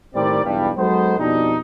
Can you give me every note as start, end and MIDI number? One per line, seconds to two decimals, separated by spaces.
0.15 0.42 45
0.15 0.42 51
0.15 0.42 55
0.15 0.42 60
0.15 0.42 70
0.15 0.42 74
0.44 0.70 35
0.44 0.70 40
0.44 0.70 43
0.44 0.70 52
0.44 0.70 55
0.77 1.17 54
0.77 1.17 56
0.77 1.17 59
0.77 1.17 63
0.77 1.17 69
0.77 1.17 72
1.18 1.57 41
1.18 1.57 47
1.18 1.57 55
1.18 1.57 62
1.18 1.57 63